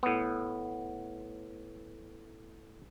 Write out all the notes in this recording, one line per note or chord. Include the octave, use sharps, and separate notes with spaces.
A2 B3